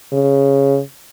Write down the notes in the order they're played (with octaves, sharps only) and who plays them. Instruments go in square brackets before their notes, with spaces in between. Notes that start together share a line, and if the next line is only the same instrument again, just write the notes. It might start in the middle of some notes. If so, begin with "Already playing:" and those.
[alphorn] C#3